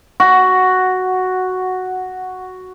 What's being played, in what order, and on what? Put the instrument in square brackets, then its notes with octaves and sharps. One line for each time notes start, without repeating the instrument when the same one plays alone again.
[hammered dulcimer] F#4 [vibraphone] F#5